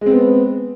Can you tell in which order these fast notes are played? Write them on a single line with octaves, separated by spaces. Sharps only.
G#3 C4 B3